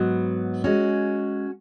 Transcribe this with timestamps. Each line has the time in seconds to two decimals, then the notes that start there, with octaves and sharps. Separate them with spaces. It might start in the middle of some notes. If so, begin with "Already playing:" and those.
Already playing: G#2 F#3 B3
0.64 G#3 C#4 F#4